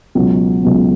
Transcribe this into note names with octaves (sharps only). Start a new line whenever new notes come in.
C#2 B2 F#3
C#2 B2 F#3